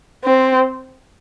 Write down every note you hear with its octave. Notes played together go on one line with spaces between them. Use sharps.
C4